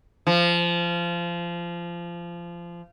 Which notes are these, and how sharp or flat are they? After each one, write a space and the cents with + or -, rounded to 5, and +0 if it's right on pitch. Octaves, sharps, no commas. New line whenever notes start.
F3 -20